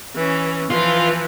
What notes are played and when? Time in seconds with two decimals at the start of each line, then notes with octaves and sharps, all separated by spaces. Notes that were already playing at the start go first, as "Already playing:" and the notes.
0.15 E3 C#4
0.71 E3 F3 F4